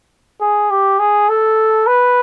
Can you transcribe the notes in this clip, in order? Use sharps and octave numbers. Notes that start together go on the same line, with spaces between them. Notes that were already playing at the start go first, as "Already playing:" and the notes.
G#4
G4
G#4
A4
B4